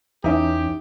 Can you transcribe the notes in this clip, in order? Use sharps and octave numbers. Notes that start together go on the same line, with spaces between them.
E2 E3 C#4 D#4 G4 E5